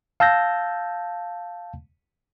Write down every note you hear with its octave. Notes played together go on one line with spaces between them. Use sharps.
F5 A5 E6 G6 A#6